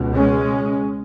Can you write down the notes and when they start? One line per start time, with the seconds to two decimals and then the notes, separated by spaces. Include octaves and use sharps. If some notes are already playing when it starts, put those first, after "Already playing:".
Already playing: C#2 B2
0.13 G#3 C#4